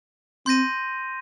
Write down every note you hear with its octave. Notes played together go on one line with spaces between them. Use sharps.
C4 C6 G6 A#6 D#7